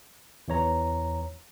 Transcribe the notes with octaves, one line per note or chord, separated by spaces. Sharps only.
E2 E3 C#5 A#5